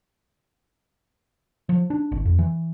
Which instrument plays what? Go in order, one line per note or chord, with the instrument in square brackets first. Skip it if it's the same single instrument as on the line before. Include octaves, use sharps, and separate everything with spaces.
[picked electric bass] F3
D4
G#1
F2
E3